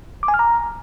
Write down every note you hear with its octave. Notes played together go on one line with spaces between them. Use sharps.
D6
G#5
F6
A#5